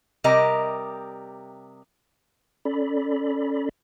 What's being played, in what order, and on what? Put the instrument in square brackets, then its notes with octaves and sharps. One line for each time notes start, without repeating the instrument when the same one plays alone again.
[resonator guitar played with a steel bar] C3 G3 G4 A#4 D#5 A#5
[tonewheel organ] C#4 A4 D5 B5